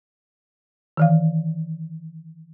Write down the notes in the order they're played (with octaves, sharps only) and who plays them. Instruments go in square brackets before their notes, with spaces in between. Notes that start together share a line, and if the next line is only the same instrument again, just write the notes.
[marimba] D#3 E3 F5